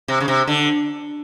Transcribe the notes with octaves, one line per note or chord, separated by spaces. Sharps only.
C3
C#3
C3
D3